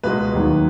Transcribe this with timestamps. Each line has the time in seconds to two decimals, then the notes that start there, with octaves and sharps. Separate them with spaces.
0.03 C#2 B2 G#3 B4
0.33 D#2 D#3 F#3